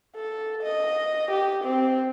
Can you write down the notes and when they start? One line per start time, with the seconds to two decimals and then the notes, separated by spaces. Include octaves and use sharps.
0.16 A4
0.63 D#5
1.31 G4
1.64 C4